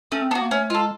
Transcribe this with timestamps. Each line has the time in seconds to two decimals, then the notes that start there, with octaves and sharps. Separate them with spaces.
0.12 A3 C#4
0.22 C4
0.31 B3 D4 F#4
0.42 A#3
0.51 A3 C#4
0.70 G#3 F4 A4